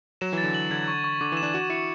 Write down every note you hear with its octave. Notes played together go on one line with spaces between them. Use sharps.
F#3 E7
E3 A6
D3
F#7
D3 G#6
C#6
C#6
D3 D6
E3 E7
D4
F#4 E7
E4 C#7